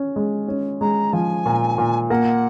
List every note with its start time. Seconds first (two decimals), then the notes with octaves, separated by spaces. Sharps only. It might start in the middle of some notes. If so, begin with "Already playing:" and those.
Already playing: C#4
0.16 G#3
0.48 C#4
0.81 G#3 A#5
1.13 F3 G#5
1.46 A#2
1.78 A#2
2.10 A#3 F#5